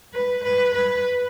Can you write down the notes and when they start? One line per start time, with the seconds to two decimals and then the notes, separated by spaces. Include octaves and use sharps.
0.14 B4
0.44 B4
0.74 B4